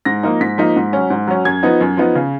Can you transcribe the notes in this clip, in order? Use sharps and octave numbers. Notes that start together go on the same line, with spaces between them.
G#2 A#6
F3 A#3 D#4
G#2 B6
F3 A#3 D#4
G#2
F#3 C#4
G#2
F#3 C#4
F#2 G#6
F3 B3 D#4
F#2
F3 B3 D#4
C#3